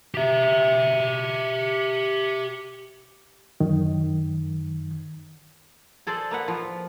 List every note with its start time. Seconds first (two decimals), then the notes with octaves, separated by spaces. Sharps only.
0.14 G4 E5
3.60 F#2 D#3
6.07 G#4 A4 C5 D5
6.31 A#3 B4 F#5
6.48 F3